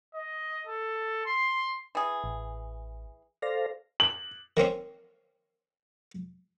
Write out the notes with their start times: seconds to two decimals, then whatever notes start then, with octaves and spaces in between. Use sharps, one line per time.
0.14 D#5
0.67 A4
1.26 C6
1.95 E3 G#4
2.24 A1
3.42 A4 C5 D5 F5 A#6
4.00 F#7
4.57 D#3 A#3 C4 C#4